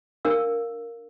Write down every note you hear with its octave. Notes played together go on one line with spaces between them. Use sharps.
D4 A#4 F5 E6